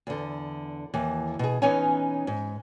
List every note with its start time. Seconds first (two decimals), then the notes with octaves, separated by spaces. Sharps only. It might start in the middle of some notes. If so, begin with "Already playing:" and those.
0.07 E2 D3
0.94 D#2 E3
1.39 B2 G#4
1.62 E3 B3 C#4 D#4 C#5 G#5
2.27 G#2